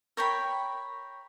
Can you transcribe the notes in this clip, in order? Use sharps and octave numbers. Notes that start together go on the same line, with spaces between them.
A#4 C#5 G5 B5